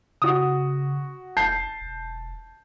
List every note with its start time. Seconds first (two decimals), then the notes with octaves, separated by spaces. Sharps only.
0.22 C#3 F#4 D#6
1.37 F1 A5 G6 C7
1.81 E1